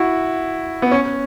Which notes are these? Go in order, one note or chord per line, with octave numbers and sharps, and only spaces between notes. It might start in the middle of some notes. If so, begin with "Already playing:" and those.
Already playing: E4 F#4
B3
C#4